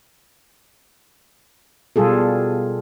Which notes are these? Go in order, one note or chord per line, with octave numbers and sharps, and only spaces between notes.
B2 G3 F4 G#4 A4